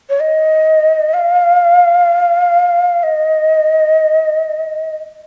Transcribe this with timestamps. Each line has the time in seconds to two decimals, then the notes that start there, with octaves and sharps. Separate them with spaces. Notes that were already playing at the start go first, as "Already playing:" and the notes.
0.10 C#5
0.20 D#5
1.14 F5
3.03 D#5